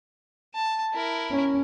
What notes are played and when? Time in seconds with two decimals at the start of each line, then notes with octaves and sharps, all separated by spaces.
0.54 A5
0.94 E4 A#4
1.31 C#4